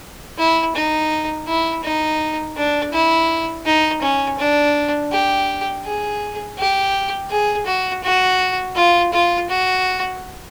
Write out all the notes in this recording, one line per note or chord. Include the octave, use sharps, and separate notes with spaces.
E4
D#4
E4
D#4
D4
E4
D#4
C#4
D4
G4
G#4
G4
G#4
F#4
F#4
F4
F4
F#4